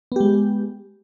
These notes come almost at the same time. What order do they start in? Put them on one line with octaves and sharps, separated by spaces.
B3 G4 G#3